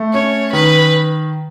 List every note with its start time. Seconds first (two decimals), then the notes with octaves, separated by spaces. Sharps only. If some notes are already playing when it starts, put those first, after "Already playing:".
Already playing: A3
0.14 C#4 C#5
0.53 D#3 B4